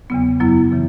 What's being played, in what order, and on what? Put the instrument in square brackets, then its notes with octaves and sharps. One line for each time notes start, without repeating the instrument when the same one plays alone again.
[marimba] E2 C#3 F#3 B3
F#2 F#3 B3 E4
C#3 E3